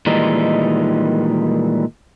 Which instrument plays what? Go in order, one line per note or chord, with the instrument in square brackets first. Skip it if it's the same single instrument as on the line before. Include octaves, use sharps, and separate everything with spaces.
[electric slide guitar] A#2 D#3 E3 G3 G#3 D#4